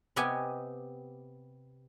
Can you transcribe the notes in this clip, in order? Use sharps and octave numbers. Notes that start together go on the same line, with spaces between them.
C3 B3 G4 D#5 G#5